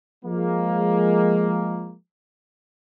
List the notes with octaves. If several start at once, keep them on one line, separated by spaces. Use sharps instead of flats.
F3 G#3 A#3